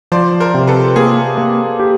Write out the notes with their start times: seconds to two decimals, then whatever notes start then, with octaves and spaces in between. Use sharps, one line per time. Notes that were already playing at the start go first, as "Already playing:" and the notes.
0.12 F3 C5 D5
0.40 A#4 C5
0.54 C3
0.67 A4 B4
0.96 A#3 G#4 A#4
1.38 A#3
1.80 G4